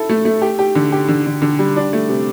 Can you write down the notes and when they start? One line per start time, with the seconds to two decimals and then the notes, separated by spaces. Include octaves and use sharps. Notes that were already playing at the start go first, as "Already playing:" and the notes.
Already playing: E4 A4
0.10 A3
0.25 A3
0.42 G4
0.59 G4
0.75 D3
0.92 G4
1.08 D3
1.26 D3
1.42 D3
1.59 G3
1.76 D4
1.93 A3
2.09 C3